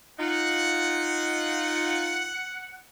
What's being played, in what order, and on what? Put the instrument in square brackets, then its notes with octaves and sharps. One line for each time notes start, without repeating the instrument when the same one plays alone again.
[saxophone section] D#4 F4 [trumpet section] F#5